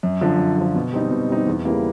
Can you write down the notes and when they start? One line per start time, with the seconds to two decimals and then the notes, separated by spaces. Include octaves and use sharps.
0.03 F#2
0.21 D3 F3
0.39 F#2
0.57 D3 F3
0.75 B2
0.93 G3 C4 D#4
1.11 B2
1.29 G3 C4 D#4
1.47 E2
1.65 C#3 E3 G3 A#3